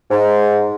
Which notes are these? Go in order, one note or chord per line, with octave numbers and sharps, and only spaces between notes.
G#2